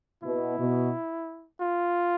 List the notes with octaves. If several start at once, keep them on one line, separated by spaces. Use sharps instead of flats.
B2 E4
B2
F4